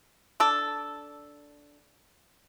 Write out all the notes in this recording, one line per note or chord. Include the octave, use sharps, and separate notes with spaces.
D4 A4